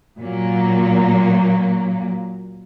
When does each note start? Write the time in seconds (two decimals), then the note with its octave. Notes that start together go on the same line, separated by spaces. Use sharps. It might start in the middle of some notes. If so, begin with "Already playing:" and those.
0.18 A#2 F#3 A#3